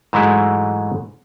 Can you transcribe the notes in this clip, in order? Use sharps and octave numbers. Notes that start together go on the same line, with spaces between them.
G#2 E3 F#3 G#3 A3 E4